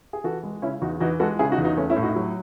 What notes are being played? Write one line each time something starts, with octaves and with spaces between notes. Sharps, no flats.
G#4
E3 F#4 A4
G#3
C#3 C#4 E4
E2 D#4 F#4
E3 D#4 F#4
G#3 F#4 A4
C#3 E4 G#4
D#4 F#4
E2
D#4 F#4
A3 C#4
C#4 E4
A2
D#4 F#4
F#3